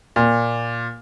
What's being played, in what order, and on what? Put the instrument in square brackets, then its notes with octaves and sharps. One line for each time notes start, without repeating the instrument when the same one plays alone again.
[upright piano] A#2